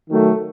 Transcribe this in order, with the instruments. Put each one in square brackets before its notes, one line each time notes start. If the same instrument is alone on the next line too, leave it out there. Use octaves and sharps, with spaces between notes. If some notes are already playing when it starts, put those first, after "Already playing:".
[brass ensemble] D#3 F#3 A3